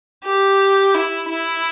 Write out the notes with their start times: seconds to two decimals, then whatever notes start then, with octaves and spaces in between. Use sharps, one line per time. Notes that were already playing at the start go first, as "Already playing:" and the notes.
0.24 G4
0.94 E4
1.29 E4